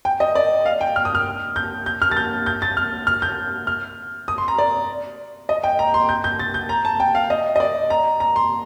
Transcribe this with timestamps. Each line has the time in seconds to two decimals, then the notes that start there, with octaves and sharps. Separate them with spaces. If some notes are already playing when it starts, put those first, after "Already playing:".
0.05 G5
0.20 D#5
0.35 D5
0.66 F5
0.81 G5
0.96 F6
1.05 D#6
1.15 F6
1.56 G6
1.86 G6
2.02 F6
2.11 A6
2.17 G6
2.46 G6
2.62 A6
2.77 F6
3.07 F6
3.22 G6
3.67 F6
4.28 D#6
4.38 C6
4.48 A#5
4.58 D5
5.49 D#5
5.64 G5
5.79 A#5
5.94 C6
6.09 G6
6.24 G6
6.39 A6
6.54 G6
6.69 A#5
6.85 A5
7.00 G5
7.15 F5
7.30 D#5
7.56 D#5
7.60 D5
7.90 A#5
8.20 A#5
8.36 C6